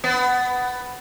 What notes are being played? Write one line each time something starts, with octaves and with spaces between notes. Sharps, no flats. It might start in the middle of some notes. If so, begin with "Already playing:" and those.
B3